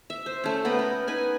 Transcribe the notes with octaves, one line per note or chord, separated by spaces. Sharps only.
E5
C5
A3 C#4
B3 A#4 B4 G5
B3 B4
D#4 B4 G#5